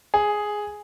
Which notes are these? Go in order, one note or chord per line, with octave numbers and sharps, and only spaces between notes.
G#4